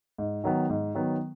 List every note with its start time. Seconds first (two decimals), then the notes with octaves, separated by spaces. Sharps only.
0.18 G#2
0.44 D#3 F#3 B3
0.70 G#2
0.95 D#3 F#3 B3